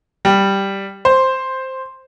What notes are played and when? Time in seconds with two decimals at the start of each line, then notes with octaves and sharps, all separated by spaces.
0.25 G3
1.05 C5